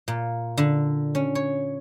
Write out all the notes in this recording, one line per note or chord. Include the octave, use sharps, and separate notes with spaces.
A#2
D3
C#4
C#5